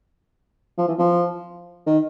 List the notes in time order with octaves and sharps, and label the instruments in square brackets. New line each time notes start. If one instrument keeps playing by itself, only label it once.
[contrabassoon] F3
E3
F3
D#3